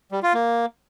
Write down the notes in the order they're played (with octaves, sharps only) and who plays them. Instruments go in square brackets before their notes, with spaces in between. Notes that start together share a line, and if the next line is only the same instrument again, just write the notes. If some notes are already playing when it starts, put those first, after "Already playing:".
[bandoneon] G3
F4
A#3